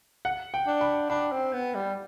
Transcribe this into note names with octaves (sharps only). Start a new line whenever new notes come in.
F#5
G5
D4
B5
D4 B5
C4
B3
G3